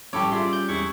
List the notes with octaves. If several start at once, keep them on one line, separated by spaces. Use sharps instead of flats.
A1 G3 C#4 G4 A4 C#5 B5 D6
F4 G#4 D5 E5 C6
G6
E2 G#3 E4 C#6